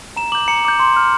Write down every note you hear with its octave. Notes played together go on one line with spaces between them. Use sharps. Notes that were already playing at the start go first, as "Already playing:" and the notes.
A#5 E7
D6 G6 F#7
A#5 C#7
D6 G6
C6
F6